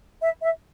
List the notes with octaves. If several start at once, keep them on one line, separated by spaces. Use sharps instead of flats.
E5
E5